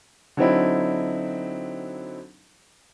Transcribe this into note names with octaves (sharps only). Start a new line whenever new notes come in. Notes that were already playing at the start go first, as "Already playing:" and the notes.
D3 F#3 C4 D#4 E4